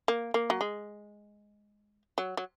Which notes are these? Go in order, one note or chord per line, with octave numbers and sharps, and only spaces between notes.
A#3
A#3
F#3
G#3
F#3
F#3